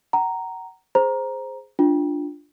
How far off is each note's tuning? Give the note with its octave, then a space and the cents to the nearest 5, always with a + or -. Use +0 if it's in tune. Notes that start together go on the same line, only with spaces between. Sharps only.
F#5 +30 A#5 +0
G#4 +0 C5 +0 A#5 +10
D4 +0 F4 +0